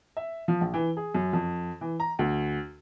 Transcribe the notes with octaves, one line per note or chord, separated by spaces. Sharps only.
E5
F3
A#1
E3
G#4
F#2
F2
E3
A#5
D2